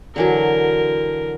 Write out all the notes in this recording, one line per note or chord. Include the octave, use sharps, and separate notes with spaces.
D3 E3 F#3 A#4